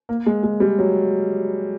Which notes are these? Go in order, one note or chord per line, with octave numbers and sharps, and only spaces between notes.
A#3
G#3
G#3
G3
F#3